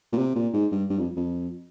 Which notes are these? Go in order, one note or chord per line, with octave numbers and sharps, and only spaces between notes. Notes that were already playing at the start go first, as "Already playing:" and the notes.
A#2
C3
A#2
G#2
G2
G2
F2
F2